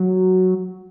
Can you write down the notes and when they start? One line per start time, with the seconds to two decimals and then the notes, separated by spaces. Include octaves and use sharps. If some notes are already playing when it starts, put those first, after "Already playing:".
Already playing: F#3